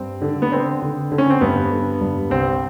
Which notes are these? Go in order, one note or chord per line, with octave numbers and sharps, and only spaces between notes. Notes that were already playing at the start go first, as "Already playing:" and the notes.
Already playing: G2 C4
D3
B3
D3 C4
D3
D3
C#4
C4
G2 B3
D3
G2
C2 C4